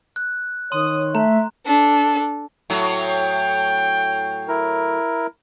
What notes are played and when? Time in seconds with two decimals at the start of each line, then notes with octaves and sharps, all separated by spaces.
0.16 F#6
0.72 D#3 C#5 C6 D#6
1.15 A3 E5 A#5
1.66 D4 A4
2.70 A2 F#3
3.01 G5
4.48 E4 A#4